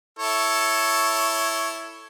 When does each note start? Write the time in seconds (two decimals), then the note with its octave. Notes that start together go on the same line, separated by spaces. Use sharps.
0.19 E4 A4 C#5